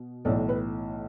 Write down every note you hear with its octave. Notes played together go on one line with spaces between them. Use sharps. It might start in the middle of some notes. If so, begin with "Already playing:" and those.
Already playing: B2
B1 A2 E3 D5
B4